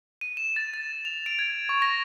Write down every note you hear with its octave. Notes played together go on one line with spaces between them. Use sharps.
D#7
E7
A6
A6
F7
D7
G#6
C#6
A#6